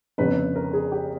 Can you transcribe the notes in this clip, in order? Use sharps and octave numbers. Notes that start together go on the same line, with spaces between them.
G1 F2 C#3 B4
A#4
G#4
G4